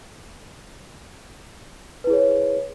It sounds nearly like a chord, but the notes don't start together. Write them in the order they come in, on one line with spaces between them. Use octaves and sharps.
B4 E4 G#4 C#5